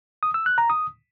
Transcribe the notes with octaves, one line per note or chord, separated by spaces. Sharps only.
D#6
E6
F#6
A#5
D#6